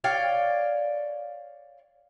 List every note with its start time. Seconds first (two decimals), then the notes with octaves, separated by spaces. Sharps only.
0.04 C#5 D5 F5 G5